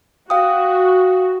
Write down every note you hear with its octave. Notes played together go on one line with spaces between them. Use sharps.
F#4 F5 G5 D#6